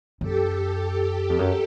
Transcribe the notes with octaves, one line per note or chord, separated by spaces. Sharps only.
F#2 G4 A4
F2
F#2